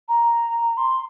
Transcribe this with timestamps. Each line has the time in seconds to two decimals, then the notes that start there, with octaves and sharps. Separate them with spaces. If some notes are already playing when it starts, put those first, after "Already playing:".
0.09 A#5
0.77 C6